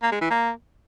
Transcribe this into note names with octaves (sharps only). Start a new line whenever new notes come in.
A#3
G#3
E3
A#3